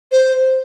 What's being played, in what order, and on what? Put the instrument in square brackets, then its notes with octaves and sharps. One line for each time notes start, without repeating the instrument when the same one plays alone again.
[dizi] C5